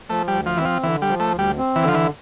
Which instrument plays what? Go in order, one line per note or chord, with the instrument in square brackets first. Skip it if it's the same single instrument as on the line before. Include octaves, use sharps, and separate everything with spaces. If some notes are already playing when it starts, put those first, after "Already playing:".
[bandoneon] F3 [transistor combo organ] A3
[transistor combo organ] G3
[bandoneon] D2
[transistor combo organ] F3
[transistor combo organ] E3 [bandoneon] C4
[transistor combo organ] F3
[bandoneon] D3 [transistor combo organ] E3
[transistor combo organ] G3
[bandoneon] F3
[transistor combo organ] A3
[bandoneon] D2
[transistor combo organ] G3
[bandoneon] C4
[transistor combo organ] E3
[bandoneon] D3
[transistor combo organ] F3
E3